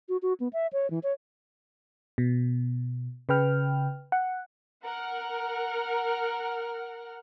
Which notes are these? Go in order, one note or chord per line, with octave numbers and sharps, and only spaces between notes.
F#4
F#4
B3
E5
C#5
E3
C#5
B2
C#3 B4 G5 F6
F#5
A#4 F#5 F6